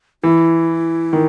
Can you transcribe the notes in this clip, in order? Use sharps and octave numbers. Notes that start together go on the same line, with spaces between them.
E3 E4
D#3